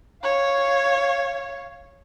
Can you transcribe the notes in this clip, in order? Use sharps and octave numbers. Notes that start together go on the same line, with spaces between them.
C#5 F5